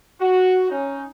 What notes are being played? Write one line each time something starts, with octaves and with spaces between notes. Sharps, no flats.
F#4
C#4 D#4